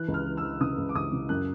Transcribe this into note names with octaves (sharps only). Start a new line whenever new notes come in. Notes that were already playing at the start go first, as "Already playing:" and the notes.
Already playing: E3 F#6
C#2
F6
E3
E6
E3
C#3 D#6
C#2
D6
C#2 D#6
C#3
F#2 F#6